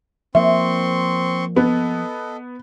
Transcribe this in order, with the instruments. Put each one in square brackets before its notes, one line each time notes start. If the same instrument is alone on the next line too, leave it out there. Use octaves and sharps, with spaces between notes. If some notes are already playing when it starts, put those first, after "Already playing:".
[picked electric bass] F3 A#3 [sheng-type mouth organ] C4 C6 C#6 [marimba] E5
[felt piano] B3 [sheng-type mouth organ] A4 D#5